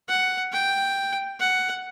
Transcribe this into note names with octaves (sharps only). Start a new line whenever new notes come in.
F#5
G5
F#5